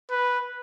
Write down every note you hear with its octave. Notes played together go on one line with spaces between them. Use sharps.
B4